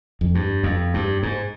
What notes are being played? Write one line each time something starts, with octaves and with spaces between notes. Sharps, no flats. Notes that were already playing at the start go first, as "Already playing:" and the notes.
F2
G2
F2
G2
G#2